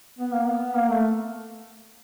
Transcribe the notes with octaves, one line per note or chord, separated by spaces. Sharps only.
B3
A#3
B3
A#3
A3